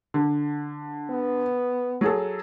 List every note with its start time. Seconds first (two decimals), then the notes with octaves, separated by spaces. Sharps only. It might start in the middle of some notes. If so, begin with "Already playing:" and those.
0.14 D3
1.10 B3
2.01 F#3 G#4 A4